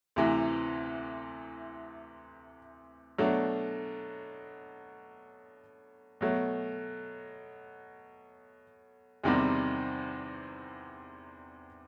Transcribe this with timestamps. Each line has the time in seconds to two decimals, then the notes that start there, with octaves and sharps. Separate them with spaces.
0.16 D2 C3 E3
3.18 B2 F#3 A3 D4
6.21 B2 F#3 A3
9.24 E2 C3 D#3 G3 C4